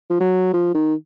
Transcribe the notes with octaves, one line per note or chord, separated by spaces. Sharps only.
F3
F#3
F3
D#3